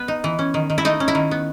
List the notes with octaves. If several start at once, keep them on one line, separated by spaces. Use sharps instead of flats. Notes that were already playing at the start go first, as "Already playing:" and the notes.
Already playing: B3 B4
D#4
E3
C#4
D#3
D#3
E4
A3 D#4
C#4
E4
D#3
B3